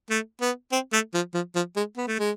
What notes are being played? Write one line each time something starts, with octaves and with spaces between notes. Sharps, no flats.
A3
B3
C4
A3
F3
F3
F3
G#3
B3
A3
G#3